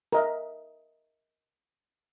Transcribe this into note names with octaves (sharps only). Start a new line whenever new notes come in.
A#4 D#5 E5